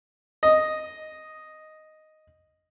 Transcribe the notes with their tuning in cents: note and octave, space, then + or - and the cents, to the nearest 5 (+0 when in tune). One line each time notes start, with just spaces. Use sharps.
D#5 +0